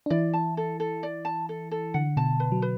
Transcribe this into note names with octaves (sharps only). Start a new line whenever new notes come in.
D4
E3 E4 D5
A5
A4
A4
D5
A5
A4
A4
D3 F#5
B2 A5
B4
F#3
B4